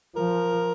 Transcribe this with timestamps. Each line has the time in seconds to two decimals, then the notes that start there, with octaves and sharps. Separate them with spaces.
0.16 F3 A#4